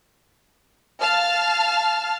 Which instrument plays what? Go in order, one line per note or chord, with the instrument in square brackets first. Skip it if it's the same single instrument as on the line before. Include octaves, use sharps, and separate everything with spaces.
[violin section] F5 A5 F6